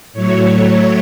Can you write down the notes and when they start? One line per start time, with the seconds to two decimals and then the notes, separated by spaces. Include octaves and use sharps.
0.13 A2 F#3 A3 C#5